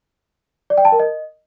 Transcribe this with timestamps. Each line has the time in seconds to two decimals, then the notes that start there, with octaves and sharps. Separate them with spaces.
0.70 D5
0.78 G5
0.85 A5
0.92 A#4
1.00 D#5